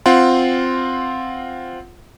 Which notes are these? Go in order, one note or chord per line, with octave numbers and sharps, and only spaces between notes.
C4 F4 F#5 C6